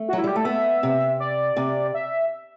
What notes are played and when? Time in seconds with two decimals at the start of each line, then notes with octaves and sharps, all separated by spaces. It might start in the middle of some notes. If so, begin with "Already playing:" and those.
Already playing: A3
0.09 F#4
0.13 F#3 E4
0.24 G3 G4
0.36 A3 A4
0.45 B3 E5
0.83 C3
1.20 D5
1.56 C3
1.94 E5